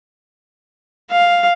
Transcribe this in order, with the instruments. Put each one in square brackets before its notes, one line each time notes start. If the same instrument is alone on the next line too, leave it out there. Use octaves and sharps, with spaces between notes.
[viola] F5